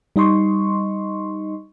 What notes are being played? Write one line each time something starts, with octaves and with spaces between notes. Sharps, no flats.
G3 D#4 D#5 C6 C#6